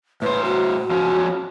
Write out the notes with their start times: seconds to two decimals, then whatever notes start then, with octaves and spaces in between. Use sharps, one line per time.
0.22 A2 B4 C5
0.45 F#4
0.91 F3 C#4